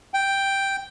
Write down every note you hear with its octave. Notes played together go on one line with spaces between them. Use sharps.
G5